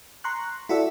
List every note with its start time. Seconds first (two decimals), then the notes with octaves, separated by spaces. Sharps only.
0.24 A#5 C6 C#6 F#6
0.69 E4 F#4 A4 D5 E5